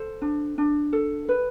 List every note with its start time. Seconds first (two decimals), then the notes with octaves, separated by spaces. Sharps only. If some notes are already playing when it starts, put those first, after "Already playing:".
Already playing: A4 C5
0.22 D4
0.58 D4
0.93 A4
1.29 B4